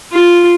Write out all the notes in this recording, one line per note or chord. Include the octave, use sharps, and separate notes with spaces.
F4